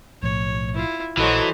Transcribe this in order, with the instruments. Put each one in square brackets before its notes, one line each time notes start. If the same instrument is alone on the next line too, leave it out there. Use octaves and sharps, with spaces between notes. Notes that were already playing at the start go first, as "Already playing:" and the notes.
[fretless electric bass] B1 A2 F3 [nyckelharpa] C#5
[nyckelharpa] E4 F4
[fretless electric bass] A#1 [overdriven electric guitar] E3 [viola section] F#3 A4 C5 [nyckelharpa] F#4 D#5